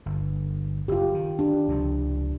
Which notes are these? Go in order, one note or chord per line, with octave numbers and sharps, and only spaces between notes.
G1
F#1 F4 G4
D#3
D4 G4
C#2 C3 F3